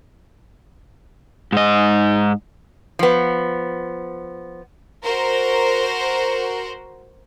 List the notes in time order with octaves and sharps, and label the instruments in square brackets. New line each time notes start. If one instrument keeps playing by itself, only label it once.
[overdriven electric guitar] G#2 D#5
[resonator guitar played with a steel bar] F3 B3
[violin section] F#4 A#4 C5